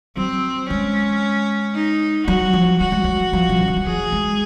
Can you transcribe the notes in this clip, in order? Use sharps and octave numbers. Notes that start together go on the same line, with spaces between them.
F#3 C4
G#3 C#4
D#4
F#3 F#4
F3
F#3 F#4
G#3
F#3
F3
C3
C#3
D#3
F3
F#3 G#4
G#3